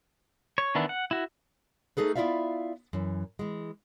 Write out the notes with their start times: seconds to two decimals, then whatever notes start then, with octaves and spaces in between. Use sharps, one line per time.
0.58 C#5
0.75 D#3 E3 B3 D4 E4
0.89 F#5
1.11 E4 F#4
1.97 A3 D#4 G#4 A4 B4
2.16 B3 E4 F4 D5 E5 F5
2.93 F#2 E3
3.39 E3 G#3